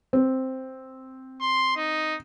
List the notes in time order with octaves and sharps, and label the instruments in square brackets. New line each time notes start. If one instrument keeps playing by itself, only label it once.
[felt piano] C4
[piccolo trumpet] C6
D#4